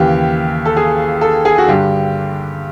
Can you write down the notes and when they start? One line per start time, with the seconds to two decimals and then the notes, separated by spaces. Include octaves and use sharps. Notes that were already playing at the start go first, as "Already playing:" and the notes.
Already playing: D#2 C#3 E3 G4
0.65 A4
0.77 G#4
1.21 A4
1.45 G#4
1.58 F#4
1.67 G2 D3 G4